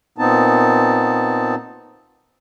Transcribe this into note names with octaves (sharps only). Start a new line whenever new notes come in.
A#2 B3 C4 D#4 A5